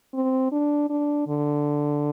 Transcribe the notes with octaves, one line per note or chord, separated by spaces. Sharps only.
C4
D4
D4
D3